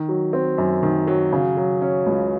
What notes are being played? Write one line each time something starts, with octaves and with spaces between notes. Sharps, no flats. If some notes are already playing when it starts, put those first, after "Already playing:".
Already playing: D#3
F#3
C4
F#2
D#3
F#3
C#3
F#3
C#4
C#2